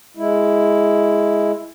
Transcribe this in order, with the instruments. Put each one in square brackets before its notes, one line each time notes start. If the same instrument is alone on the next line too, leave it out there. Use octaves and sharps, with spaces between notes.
[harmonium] G#3 E4